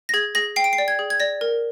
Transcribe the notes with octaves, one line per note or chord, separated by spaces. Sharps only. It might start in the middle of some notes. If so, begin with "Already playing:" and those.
A#6
G#4 G#6
G#4 A#6
G5 C7
D7
C7
D5
G#6
G#4
G#6
D5 A#6
A#4